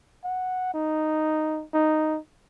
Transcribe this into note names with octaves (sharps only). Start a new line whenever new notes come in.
F#5
D#4
D#4